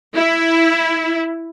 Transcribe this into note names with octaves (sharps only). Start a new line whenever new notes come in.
E4